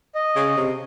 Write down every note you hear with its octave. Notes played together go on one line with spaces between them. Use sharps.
D#5
C#3
C3